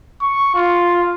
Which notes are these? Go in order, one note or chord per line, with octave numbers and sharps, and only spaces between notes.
C#6
F4